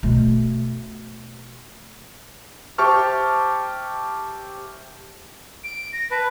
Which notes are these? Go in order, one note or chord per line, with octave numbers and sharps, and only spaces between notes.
B2 A3
G4 C5 E5 A5 C#6 F6
D7
A#6
B4 A5